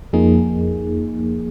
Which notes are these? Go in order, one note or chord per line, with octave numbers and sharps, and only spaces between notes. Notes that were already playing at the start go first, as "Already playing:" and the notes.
F2 F3 A#3 D#4 G#4